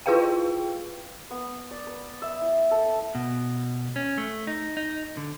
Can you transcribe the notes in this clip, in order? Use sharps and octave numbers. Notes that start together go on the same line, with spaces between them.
E4 F4 G#4 B4 F5 G5
B3
D5
B4
E5
E4
A4
B2
C#4
A3
D#4
D#4
D3